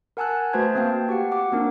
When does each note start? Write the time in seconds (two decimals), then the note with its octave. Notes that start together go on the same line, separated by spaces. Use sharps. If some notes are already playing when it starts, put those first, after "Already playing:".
0.17 A#4 F#5 G#5 A5 E6 F#6
0.53 A3 F#4 B4 C5 A5 G#6
0.75 A#3 C4 F5 G5 A5
1.09 F#4 G4 F#5
1.32 F#5 D6
1.52 A#3 C4 D4 D#4 A#4